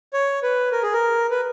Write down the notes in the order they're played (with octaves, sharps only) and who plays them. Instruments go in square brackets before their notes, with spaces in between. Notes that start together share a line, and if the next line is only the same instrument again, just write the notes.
[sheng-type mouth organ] C#5
B4
A#4
G#4
A#4
B4